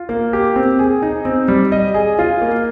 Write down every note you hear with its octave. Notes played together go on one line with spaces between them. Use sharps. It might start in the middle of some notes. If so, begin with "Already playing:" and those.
Already playing: F4
A#3
G4
C4
G#4
D#4
C4
G3
D#5
G#4
F4
A#3